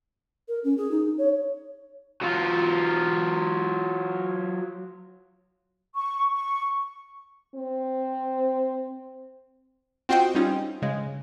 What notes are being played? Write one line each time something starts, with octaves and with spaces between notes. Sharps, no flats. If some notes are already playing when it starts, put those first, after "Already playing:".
A#4
C#4
G#4
D#4
C#5
F#3 F4
C#6
C#6
C4
C4 F4 F#4 C5 D#5 G5
G3 C4 C#4 D#4 F4
C#3 G#3